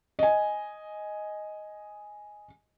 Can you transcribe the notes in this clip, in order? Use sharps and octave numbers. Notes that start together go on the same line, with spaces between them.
D#5 G#5